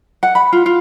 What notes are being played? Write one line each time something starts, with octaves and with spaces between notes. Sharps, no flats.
F#5
B5
F4
F4